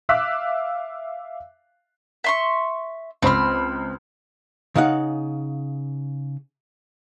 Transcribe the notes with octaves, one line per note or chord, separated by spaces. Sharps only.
E5 F5 D6 E6 F#6 B6
E5 C6 C#6
C#2 C4 C5 B5 F6
C#3 D#4 F5 F#5